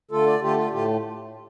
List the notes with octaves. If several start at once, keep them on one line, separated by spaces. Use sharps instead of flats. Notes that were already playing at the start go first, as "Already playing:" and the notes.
D3 A3 F4 A4
D5
D3 A3 F4 G4
F4
A2 A3 F4 G4